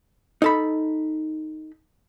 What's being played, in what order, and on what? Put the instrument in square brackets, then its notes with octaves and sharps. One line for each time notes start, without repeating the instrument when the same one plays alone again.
[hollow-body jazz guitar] D#4 A4 B5